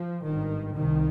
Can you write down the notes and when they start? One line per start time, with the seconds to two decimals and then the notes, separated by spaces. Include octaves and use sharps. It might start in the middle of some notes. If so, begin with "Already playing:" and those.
Already playing: F3
0.24 G#1 G2 D#3
0.74 C2 C3 D#3